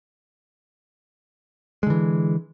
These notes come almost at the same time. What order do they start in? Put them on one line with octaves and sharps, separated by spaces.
G#3 D3 E3